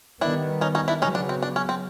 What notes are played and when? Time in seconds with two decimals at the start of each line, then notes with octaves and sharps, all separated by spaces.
0.21 D#3 G3 B3 D4 E4
0.61 C#4 D#4
0.75 C#4 D#4
0.88 D4 E4
1.02 C#3 F#3 B3 C#4 D#4
1.15 D4
1.29 C4
1.43 D4
1.56 C#4
1.69 C4